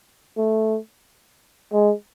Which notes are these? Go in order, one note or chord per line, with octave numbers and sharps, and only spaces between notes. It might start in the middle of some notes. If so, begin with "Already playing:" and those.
A3
G#3